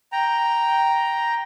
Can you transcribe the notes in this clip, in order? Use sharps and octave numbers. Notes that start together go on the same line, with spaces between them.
G5 A#5